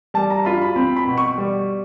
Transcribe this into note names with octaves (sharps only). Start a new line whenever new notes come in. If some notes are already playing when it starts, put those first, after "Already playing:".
G3 A5
A#5
F4 B5
B5
C4 B5
B5
B2
C#6
G3